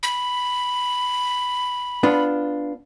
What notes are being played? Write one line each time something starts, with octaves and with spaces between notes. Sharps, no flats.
B5
B3 D4 F4